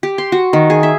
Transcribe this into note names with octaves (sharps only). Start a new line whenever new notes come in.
G4
C6
F#4
D#3
G#4
E5